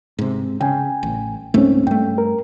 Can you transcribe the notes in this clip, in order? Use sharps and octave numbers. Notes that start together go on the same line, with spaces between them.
G#2 C3
C#3 G5 G#5
A1
C#2 G#2 A3 A#3 C4 C#4
G2 A3 G5
A#4